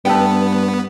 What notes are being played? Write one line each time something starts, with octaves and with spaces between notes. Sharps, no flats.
G2 A3 B3 B4 G5